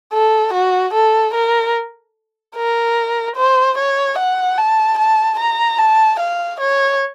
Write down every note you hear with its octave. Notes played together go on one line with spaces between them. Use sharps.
A4
F#4
A4
A#4
A#4
C5
C#5
F#5
A5
A5
A#5
A5
F5
C#5